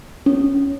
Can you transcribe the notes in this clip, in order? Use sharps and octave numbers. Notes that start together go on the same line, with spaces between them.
C#4